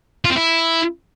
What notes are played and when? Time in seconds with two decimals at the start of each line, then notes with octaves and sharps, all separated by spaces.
0.25 F4
0.30 C4
0.36 E4